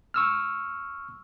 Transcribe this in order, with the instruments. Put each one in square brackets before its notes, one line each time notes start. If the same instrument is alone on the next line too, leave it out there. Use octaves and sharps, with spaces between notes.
[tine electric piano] C#6 E6 F6